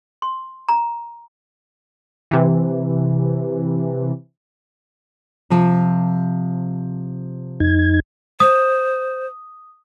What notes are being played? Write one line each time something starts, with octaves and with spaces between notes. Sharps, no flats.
C6
A#5
C3 E3
C3 F3 A5
F2 D#4 G#6
C5 D#6